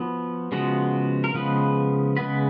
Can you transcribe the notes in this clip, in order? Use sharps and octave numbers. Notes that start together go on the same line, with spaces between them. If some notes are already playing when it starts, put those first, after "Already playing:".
Already playing: F3 B3 F#4
C#3 F3 G#3 B3 F#4
A#4
C#3 F3 G#3 B3 B4
C#3 G#3 B3 B4